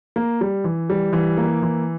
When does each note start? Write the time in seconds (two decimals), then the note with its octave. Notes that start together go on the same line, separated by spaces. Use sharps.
0.16 A#3
0.41 G3
0.64 E3
0.90 G3
1.13 E3
1.37 A#3
1.62 E3